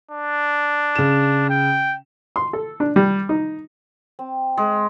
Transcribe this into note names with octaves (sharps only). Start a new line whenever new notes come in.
D4
C#3 E7
G5
C6
A4
D4
G3
D#4
C4
G#3